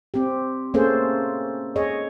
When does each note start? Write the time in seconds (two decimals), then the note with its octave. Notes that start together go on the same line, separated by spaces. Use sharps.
0.14 C4 G4
0.74 A3 A#3 C#4 G#4 A4 C5
1.76 G#4 C#5 D#5